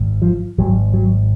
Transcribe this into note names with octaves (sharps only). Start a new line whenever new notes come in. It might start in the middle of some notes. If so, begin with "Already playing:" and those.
Already playing: G#1 G#2
F3
G#1 G#2 F#3
F#3